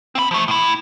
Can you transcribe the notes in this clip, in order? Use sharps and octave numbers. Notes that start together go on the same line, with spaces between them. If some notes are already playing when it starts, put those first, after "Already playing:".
C4 B5
F3 A3
A2 E4